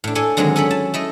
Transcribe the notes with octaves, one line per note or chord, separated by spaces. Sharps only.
A2 D4
D4 A4 C#5 G#5
D3 D#3 F#3 G#3 C4 G#4
C#4 A4 C#5 D5 B5
A5
A3 E4 D#5